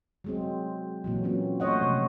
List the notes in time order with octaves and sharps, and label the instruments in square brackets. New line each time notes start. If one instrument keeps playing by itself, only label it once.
[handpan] F#3 G#3 C4
A#2 E3 F#3
F#3 C4 C#4
A3 C5 C#5 D#5 F#5
C3 F3